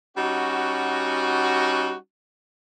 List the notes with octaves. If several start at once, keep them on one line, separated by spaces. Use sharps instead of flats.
G3 C#4 D#4 F#4